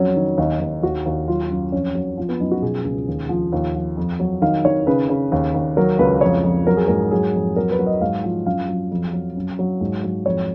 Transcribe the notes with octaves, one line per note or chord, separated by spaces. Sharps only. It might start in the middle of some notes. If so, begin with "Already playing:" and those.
Already playing: F2 F#3 C#4
D#3
D#2 D#4
D#2
D#2 F#4
D#2
F#3 F4
F#2
F2 C#4
F#3
F3
B3
F#2 D#4
F#4
B2 G#4
C#2
D#2
F3
D#2
F3
F2
F#3
D#3 F5
D#3 C#5
C#3 B4
C#3
D#2
D#2
F#3 A#4
C#2 B4
F2 C#5
F2
F#3 A#4
G#4
G#2 A#4
F#3 G#4
F2
F#3 A#4
B4
F#3
D#5
G#2 F5
F3
F#2 F5
F#3
F2
F#3
F#2
F#3
G#2
F#3
F2 C#5